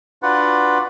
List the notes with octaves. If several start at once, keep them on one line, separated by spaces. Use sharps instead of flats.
D4 F4 F#4 B4 D5 F#5